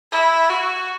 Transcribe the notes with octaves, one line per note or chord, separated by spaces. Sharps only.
E4
F#4